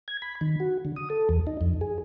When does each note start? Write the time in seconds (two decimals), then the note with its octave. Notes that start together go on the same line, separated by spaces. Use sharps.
0.08 G#6
0.22 B5
0.41 D#3
0.60 F#4
0.85 D3
0.96 D#6
1.10 A4
1.29 E2
1.47 D#4
1.61 F2
1.81 G#4